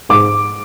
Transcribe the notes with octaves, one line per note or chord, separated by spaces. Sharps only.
G#2 D6